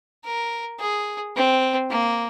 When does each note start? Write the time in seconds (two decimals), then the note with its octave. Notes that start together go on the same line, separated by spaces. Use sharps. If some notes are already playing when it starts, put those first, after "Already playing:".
0.25 A#4
0.80 G#4
1.36 C4
1.90 A#3